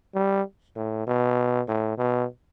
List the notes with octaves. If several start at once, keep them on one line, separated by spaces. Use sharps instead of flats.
G3
A2
B2
A2
B2